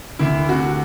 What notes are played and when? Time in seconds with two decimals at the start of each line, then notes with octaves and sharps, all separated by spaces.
0.19 D2 E4
0.49 C3 F#4